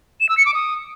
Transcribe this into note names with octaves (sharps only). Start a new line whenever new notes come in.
E7
E6
C#7
D6
D#6